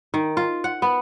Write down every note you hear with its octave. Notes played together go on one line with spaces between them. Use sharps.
D#3
F4
F#5
B3